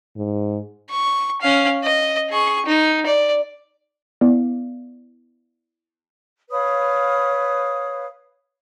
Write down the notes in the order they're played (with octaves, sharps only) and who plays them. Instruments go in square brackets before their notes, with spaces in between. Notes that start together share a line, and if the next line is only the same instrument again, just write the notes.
[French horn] G#2
[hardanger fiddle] C#6
C#4 F5
D#5
G#4 C#6
D#4
D5
[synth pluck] B3 E4 D5 F5
[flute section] B4 C#5 F5 D#6